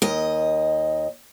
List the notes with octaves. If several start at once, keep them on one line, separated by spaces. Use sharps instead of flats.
D#2 D#5